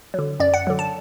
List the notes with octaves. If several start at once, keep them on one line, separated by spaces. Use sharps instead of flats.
D3 F#3
F#2 D5
F#5
D3 F#3
A5